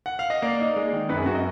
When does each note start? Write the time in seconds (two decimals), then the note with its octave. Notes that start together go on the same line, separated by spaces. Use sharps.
0.06 F#5
0.19 F5
0.30 D#5
0.42 A#3 D5
0.60 D#4
0.76 G#3
0.93 D#3
1.09 F#2 B4
1.18 G#4
1.26 F#2 F#4
1.35 D#5